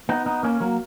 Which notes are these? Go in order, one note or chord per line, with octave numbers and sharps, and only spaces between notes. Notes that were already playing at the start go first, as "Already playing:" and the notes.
B3 D#4
B3 D#4
A#3 C#4
F#3 A#3